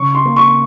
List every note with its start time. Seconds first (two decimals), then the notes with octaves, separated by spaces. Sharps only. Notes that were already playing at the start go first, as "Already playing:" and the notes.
Already playing: C#3 C#6
0.15 C6
0.25 A#3
0.36 C#6